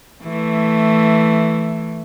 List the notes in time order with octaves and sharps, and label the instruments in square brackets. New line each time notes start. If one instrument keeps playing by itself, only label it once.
[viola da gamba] E3 A3